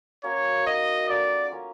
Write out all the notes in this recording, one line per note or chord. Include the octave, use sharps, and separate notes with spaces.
A#3 C#4 F#4 C#5
D#4 F#4 A#4 D#5
F#3 A3 C#4 F4 D5
A#3 C#4 F4